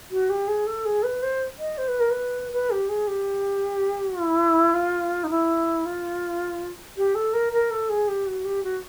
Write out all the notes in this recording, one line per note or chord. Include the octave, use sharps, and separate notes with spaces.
F#4
G4
G#4
A4
G#4
B4
C5
D#5
C5
B4
A#4
B4
B4
G4
G#4
G4
E4
F4
D#4
E4
F4
G4
A4
A#4
A#4
A4
G#4
G4
F#4
G4
F#4